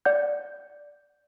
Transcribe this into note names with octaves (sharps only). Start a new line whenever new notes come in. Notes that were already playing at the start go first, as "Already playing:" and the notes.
D5 F#5 G6